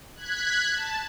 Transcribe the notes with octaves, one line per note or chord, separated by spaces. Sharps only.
F#6 G#6 B6
A5